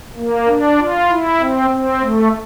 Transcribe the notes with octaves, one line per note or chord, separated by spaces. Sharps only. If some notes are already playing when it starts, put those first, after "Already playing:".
A#3
D4
F4
E4
C4
C4
A3